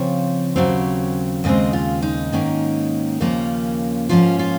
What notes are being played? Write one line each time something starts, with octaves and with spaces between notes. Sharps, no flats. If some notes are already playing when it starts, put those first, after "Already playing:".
Already playing: C#3 F3 C4 C#5
D#2 C#3 F#3 C4
D#2 C#3 G#3 C4 D#5
F4
D#4
G#2 D#3 A#3 C#4
D#2 C#3 F3 A#3 C#4
G#2 F3 A#3 C#4 F4
F4